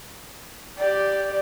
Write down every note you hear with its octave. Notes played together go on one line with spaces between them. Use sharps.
G4 D5